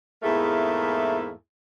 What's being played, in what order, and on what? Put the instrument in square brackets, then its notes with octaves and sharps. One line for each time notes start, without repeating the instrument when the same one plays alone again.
[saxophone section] E2 G#2 A3 A#3 E4 G#4